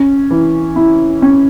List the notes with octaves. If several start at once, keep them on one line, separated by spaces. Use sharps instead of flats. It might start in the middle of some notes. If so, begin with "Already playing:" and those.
Already playing: C#4
E3
E4
C#4